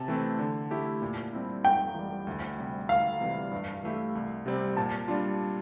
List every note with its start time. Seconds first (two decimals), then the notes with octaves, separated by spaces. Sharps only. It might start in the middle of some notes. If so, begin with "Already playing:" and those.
Already playing: C3 A5
0.08 E3 A3 C4
0.39 D3
0.71 A3 E4 G4
1.02 A#2
1.33 G3 C4 E4
1.64 F2 G5
1.95 E3 G3
2.27 D2
2.58 C3 G3
2.89 D2 F5
3.21 C3 E3 G3
3.51 G2
3.83 E3 A3 E4 G4
4.15 C2
4.46 C3 G3 C4
4.77 A#2 A5
5.08 G3 D4 F4